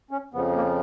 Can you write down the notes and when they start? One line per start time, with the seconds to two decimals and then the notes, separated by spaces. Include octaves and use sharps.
0.11 C#4
0.34 F2 C#3 F3 B3
0.55 A#3